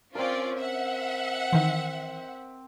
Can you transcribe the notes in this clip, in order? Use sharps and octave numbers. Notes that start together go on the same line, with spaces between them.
C4 C#4 F4 A#4 D5
E5 F#5
D#3 E3 C4